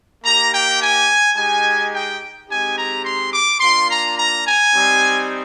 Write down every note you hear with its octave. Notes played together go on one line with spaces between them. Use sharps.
A#3 D#4 G4 A#5
G5
G#5
G#3 D#4 G4 G#5
G5
G#3 C4 D#4 G4 G#5
A#5
C6
D6
A#3 D4 F4 C6
A#5
A#5
G#5
G3 C4 D#4 G4